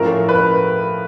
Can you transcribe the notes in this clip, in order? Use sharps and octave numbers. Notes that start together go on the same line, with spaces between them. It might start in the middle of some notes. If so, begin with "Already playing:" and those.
Already playing: A2 F3 A3 C#4 A#4
B4